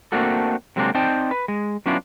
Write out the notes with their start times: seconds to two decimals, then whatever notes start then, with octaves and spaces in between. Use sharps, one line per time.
0.12 A3 A#3 C4 D4 F#4 A4
0.76 C3 F#3 G#3 A#3 C4 D4
0.95 C4 D#4 C5 D5 G5 A5
1.31 B4
1.48 G#3
1.86 F#3 B3 C#4 D4 E4 F4